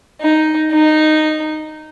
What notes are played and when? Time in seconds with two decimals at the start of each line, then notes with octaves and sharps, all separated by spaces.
0.19 D#4
0.71 D#4